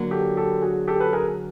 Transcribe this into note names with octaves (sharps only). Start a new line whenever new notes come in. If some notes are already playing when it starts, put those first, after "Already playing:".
Already playing: D3 F#3 A#3
G4 A4
G4 A4
F#4 G#4
G4 A4
A4 B4
G#4 A#4